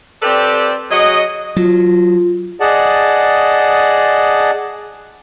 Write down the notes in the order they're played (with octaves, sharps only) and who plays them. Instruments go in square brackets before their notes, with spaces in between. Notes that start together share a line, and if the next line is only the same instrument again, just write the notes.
[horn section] C4 G4 A4 B4 D5
F#3 F#4 G#4 D#5
[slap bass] F#3 [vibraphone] F4
[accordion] G#4 D5 D#5 F#5 A5